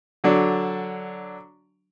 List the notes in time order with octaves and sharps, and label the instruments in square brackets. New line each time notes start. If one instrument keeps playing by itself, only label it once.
[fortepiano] D3 F#3 D4